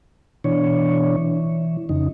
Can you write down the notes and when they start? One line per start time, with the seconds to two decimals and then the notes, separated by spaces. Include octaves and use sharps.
0.44 B2 E3 D4 C#5
1.17 E3
1.89 F2 C#3 D#4